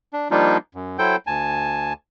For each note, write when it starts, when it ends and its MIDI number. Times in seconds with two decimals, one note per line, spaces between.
0.13 0.28 62
0.31 0.57 53
0.31 0.57 55
0.31 0.57 58
0.31 0.57 62
0.31 0.57 63
0.31 0.57 65
0.75 0.97 42
0.99 1.16 54
0.99 1.16 64
0.99 1.16 69
0.99 1.16 72
0.99 1.16 79
0.99 1.16 91
1.27 1.93 38
1.27 1.93 80
1.27 1.93 81